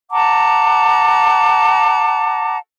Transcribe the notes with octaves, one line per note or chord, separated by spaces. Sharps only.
F#5 A5 A#5 D6